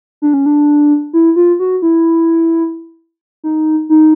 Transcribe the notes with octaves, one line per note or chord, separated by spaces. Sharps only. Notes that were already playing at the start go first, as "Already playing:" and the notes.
D4
C#4
D4
E4
F4
F#4
E4
D#4
D#4